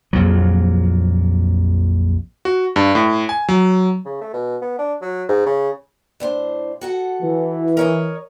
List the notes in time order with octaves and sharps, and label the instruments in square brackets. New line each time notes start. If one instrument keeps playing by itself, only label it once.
[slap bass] A#1 F2 A#2 F#3
[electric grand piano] F#4
G2
A2
G#5
F#3
[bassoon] C#3
A3
B2
B3
D4
F#3
G#2
C#3
[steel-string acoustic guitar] A2 D4 C5
F#4 A4 F#5
[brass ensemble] E3
[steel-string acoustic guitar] A#4 C#5 D#5